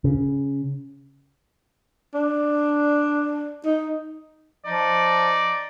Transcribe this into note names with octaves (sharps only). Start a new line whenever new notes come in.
C#3
D4
D#4
F3 D#4 D5